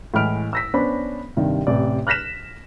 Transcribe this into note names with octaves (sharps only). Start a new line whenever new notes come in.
A2 E3 G#3 B5 F6 D7
E6 A#6 B6
B3 C#4 D4 C5 B5
G2 C3 D#3
A1 C3 D5
F6 F#6 A#6 B6 E7